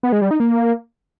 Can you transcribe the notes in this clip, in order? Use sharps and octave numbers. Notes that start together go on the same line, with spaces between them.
B3
G#3
G3
D#4
A#3